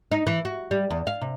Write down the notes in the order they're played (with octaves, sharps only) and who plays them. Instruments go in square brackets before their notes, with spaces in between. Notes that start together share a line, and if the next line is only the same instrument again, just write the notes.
[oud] D#4
E3
F#4
G3
E2
F5
C3